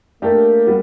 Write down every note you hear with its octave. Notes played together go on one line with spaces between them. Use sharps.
A3 A#3 D4 G4 A#4
G3 B3